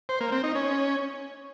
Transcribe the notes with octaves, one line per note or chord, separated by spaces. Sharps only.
C5
A#3
C4
D#4
C#4